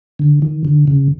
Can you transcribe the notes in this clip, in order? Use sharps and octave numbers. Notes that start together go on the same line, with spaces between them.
D3
D#3
D3
C#3